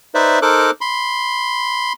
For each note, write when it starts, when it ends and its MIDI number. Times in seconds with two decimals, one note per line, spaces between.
0.14 0.39 63
0.14 0.39 71
0.14 0.39 72
0.14 0.39 74
0.14 0.39 76
0.42 0.71 63
0.42 0.71 69
0.42 0.71 70
0.42 0.71 72
0.42 0.71 86
0.42 0.71 90
0.81 1.93 83
0.81 1.93 84